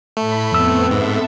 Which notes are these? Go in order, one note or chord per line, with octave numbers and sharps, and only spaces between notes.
A2 A3 B5
F2 B3 C4 E6
G#2 A4 E5